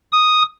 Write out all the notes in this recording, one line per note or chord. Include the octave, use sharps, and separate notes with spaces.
D#6